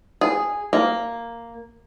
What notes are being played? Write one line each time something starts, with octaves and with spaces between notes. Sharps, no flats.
G#4
A#3